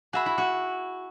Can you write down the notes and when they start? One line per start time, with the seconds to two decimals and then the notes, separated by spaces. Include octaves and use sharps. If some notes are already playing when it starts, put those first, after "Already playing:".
0.13 F#4 G#4 E5 B5
0.26 E4
0.38 F#4